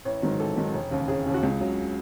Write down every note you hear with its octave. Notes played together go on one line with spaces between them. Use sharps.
A1 C#5
G#2 D#3 F#3
A1 A4
G#2 D#3 F#3
E1
D#2 C#3
E1 G#4
D#2 C#3
F#4
C#2 G#4
C#3 F#3